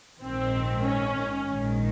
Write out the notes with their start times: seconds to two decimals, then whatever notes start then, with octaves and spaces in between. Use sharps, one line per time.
0.22 A#1 G#2 D#3 C4
0.85 C#4
1.47 A#1 G#2 D#3